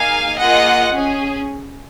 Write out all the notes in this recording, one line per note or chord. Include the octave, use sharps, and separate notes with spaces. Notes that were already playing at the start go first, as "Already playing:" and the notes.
Already playing: A#3 D#4 G#4 F5 G#5
A#3 F4 G#4 D#5 F#5
C#4 G#4